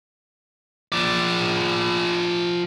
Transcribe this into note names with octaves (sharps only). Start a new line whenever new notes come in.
F3 D5